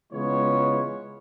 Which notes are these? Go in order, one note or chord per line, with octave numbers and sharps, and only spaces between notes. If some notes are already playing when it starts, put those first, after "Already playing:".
C#3 E3 G#3 B3 F4 C#5